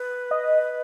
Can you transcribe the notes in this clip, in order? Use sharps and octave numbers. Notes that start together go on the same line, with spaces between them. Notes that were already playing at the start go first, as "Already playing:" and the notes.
Already playing: B4
D#5